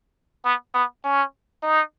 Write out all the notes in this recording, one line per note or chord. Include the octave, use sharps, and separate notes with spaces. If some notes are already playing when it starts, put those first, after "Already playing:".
B3
B3
C#4
D#4